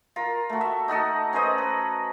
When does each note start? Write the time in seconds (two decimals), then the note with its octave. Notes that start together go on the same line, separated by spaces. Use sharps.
0.16 F4 A#4
0.50 A3 F#4
0.61 E5
0.88 D#4 F#4 A4 D#5
1.33 C#4 B4 C5 D#5
1.58 B4